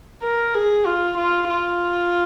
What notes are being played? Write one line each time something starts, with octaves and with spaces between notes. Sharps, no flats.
A#4
G#4
F4
F4
F4